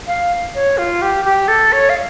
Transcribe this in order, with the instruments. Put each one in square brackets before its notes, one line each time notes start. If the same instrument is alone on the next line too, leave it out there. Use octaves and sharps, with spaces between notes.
[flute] F5
C#5
F4
G4
G4
A4
C#5
F5